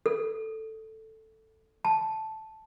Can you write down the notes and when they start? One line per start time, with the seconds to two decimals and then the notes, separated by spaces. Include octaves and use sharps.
0.06 A4
1.85 A5